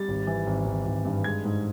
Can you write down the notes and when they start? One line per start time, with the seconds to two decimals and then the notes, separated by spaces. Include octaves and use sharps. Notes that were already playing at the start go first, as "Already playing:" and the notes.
Already playing: G3 A6
0.08 G#1
0.27 E3
0.47 G#1
0.66 G#1
0.86 G#1
1.05 G2
1.24 G#3 G#6
1.44 G#2